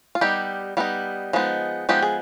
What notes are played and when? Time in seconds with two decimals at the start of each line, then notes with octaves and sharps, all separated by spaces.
0.15 F4
0.21 G3 B3 D#4 G4
0.77 G3 B3 D#4 F4
1.33 F3 G#3 B3 D#4
1.89 F3 G#3 B3 D#4 G4
2.03 G#4